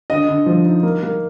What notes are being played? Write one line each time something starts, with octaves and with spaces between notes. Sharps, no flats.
D3 D#5
D3
F3
D#4
A#3
A#3